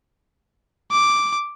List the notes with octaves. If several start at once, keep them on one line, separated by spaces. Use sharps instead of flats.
D6